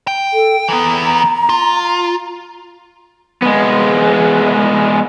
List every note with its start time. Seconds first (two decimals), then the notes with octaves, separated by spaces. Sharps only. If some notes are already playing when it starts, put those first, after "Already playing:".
0.07 G5
0.34 A4
0.68 E3 B3 A#5
1.49 F4
3.42 G#3 B3